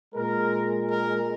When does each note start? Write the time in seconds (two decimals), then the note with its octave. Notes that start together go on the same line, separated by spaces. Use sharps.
0.15 A#2 G#3 A#4
0.90 A#4